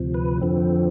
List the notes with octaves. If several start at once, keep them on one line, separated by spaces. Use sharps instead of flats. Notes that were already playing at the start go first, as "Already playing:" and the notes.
Already playing: D2 C3 F3
B4
F2 D3 F3 C4